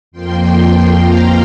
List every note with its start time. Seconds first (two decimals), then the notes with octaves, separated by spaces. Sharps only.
0.12 F2 F3 A#3 G5 C6
0.94 F5 A#5